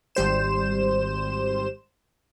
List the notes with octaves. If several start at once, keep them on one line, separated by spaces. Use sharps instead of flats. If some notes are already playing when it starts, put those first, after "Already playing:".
G#1 G3 C5 E7